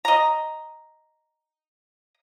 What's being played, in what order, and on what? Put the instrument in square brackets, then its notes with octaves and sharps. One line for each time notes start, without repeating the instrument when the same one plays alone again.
[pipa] D#5 A#5